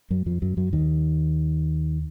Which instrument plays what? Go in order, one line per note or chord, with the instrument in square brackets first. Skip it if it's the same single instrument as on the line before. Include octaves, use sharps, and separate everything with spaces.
[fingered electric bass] F#2 F#3
F2 F3
F#2 F#3
F#2 F#3
D#2 D#3